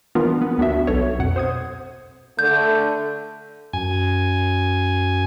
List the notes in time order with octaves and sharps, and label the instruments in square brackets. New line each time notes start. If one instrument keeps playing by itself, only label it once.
[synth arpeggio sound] E3 B3 D4 F4 A#4 B4
B3
D2 B3 D4 F#4 E5
B1 A4 C#5
F2 B2 F#5
C5 D#6 G#6
[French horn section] D3 A3 [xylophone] G6
[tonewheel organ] F#2 G#5